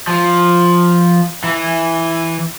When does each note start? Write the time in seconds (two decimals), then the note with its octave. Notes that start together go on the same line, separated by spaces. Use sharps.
0.07 F3
1.44 E3